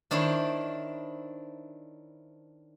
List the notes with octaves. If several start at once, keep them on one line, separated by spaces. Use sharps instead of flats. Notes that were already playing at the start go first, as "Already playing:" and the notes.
D#3 D4 E4 C5 C#5